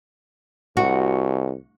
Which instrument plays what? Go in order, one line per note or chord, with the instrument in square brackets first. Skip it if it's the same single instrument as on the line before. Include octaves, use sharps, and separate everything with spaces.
[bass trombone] C2 [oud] F#4